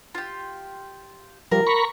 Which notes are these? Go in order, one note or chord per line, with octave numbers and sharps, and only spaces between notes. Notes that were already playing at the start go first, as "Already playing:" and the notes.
F4 G4
F3 G3 A#4
A#5 B5 C#6